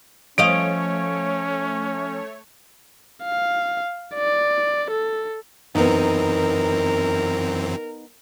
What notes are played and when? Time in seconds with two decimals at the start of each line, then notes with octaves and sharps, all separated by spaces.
0.38 F3 A3 C#4 C#5 D#5 F5 D7
3.25 F5
4.15 D5
4.91 A4
5.75 F#2 E3 B3 C4 D#4 A#4